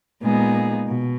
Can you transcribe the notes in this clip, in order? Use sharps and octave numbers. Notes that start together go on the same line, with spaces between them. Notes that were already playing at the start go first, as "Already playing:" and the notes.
A#2 G#3 B3 D#4 G#4
B2